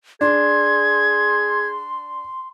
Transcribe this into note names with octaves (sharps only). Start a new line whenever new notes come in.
D4 G#4 C6 G#6